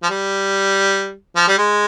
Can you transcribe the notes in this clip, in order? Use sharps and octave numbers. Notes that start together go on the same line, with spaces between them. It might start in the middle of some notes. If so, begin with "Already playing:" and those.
F3
G3
F3
G3
G#3